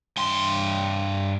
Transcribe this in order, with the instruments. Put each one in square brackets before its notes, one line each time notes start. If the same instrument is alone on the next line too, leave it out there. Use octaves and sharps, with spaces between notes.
[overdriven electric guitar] G2 C6